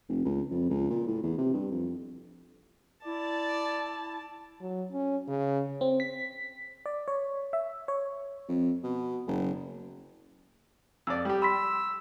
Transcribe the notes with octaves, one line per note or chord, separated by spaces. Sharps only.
F1
C#2
F2
C#2
A#2
A2
E2
C3
G2
F2
E4 D5 A5
F#3
C#4
C#3
C4
B6
D5
C#5
E5
C#5
F2
B2
F#1
F2 D5 E6
G3 G4
B5 C6 E6 B6